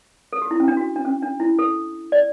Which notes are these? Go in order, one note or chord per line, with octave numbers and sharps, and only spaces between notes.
A4
G4
E4
C#4
D4
F#4
D4
C#4
D4
E4
A4
D5